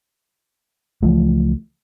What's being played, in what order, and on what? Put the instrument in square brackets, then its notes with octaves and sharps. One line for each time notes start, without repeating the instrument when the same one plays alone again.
[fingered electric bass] C#2 E3 F3 A3